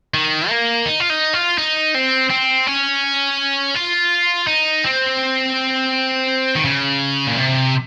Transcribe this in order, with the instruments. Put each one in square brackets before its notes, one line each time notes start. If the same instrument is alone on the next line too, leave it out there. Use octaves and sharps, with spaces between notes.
[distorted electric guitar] D#3
A#3
D#4
F4
D#4
F4
D#4
C4
C4
C#4
F4
D#4
C4
D#3
C#3
A#2
C3